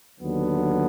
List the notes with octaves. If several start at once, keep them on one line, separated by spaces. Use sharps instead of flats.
D#2 D3 F#3 B3